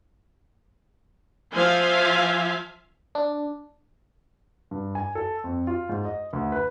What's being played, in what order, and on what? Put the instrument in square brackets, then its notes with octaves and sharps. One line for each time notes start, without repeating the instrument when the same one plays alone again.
[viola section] F3 F4 C5 E5 F5 G#5
[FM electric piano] D4
[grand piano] G2
G#5
A4
F2
F4
G#2
D#5
D2
B4